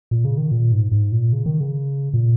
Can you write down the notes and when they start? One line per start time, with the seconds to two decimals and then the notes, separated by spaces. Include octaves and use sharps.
0.11 A#2
0.25 C#3
0.37 D#3
0.51 A#2
0.72 G#2
0.92 G#2
1.12 A#2
1.33 C#3
1.46 D#3
1.60 C#3
2.14 A#2